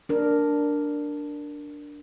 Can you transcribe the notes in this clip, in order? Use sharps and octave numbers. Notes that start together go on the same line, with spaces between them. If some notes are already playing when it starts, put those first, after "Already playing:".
D4 A#4